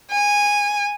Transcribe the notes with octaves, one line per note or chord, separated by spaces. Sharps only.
G#5